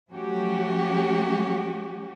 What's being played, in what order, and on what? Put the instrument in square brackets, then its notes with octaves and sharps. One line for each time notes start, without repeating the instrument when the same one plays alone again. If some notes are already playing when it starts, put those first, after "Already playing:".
[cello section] F3 F#3 A3 C#4 F#4 G4